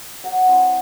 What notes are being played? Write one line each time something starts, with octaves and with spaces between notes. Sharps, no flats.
F#3 F#5
C4 E4